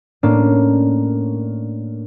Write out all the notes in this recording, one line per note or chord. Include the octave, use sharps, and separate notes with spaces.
A2 A#3 C#4 D4